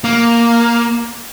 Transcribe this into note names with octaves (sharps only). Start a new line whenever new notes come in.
A#3